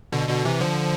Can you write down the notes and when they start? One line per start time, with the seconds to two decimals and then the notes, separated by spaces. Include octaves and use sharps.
0.12 B2 D3
0.28 B2 D3
0.45 C3 E3
0.61 D3 F3